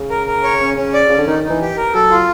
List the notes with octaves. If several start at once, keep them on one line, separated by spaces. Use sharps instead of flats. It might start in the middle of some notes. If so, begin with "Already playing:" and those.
Already playing: C#3
A#4
A#4
C#5
C#4
C#4
D5
C#3 C#4
D3
D#3 D#4
D#4
E3
G4
A#4
F#3 A4
F4